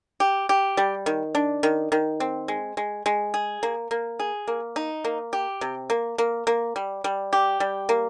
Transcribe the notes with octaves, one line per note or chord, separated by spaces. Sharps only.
G4
G4
G3
D#3
D4
D#3
D#3
C4
G#3
G#3
G#3
G#4
A#3
A#3
G#4
A#3
D#4
A#3
G4
C3
A#3
A#3
A#3
G3
G3
G4
G3
A#3